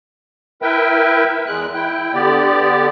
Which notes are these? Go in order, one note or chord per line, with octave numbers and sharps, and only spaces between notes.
E4 A#4 B4 E5 G5
E2 G#3 F#6
E4 G5
D3 B3 G4 D5